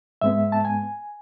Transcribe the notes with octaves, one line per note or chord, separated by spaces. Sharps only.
G#2 G#3 B3 E5
A5
G#5